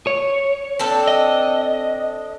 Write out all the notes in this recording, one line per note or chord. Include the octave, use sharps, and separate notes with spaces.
C#5
C4 D4 A4
D#5